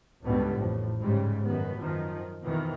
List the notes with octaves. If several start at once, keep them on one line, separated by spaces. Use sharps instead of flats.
C#2 G2 B2 D3 G3 B3
A1 F2 A2
G#2 C#3 G3 G#3
F#2 D#3 B3
F#2 D#3 F3
F2 B2 D#3 E3